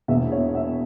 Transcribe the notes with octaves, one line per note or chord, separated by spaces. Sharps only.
E1 E2 B2 E5
C#5
E5